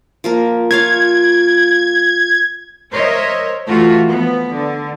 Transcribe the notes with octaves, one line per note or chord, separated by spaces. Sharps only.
F3 A#3 A#4
F4 C#5 F5 G#6
A#4 C5 C#5 D#5 E5
E3 A3 F4 F#4
F3 B3
D3